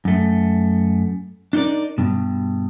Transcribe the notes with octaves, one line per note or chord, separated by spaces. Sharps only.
F#2 A3
D4 D#4 F#4 A#4 D5
G2 B2